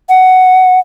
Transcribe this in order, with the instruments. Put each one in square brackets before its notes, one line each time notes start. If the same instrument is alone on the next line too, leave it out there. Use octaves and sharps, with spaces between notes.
[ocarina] F#5